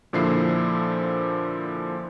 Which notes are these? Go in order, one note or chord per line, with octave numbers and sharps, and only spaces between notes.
A#2 D3 F3 E4 C7